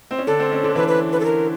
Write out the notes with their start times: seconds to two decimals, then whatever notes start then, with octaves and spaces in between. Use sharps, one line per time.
0.11 C4
0.19 C#4
0.27 D3 D4 A4
0.39 C4
0.52 C#4
0.64 D3 D4
0.75 E3 E4 B4
0.88 B4
1.12 B4
1.20 A4
1.25 A#4